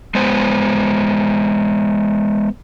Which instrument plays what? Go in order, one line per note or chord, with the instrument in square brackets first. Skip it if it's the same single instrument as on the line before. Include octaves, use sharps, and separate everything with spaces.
[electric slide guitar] G#3 B3 C5